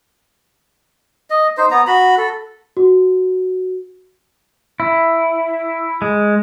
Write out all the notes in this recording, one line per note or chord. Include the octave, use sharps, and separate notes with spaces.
D#5
D#4 C5
B3 A#5
F#4 B5
A4
F#4
E4
G#3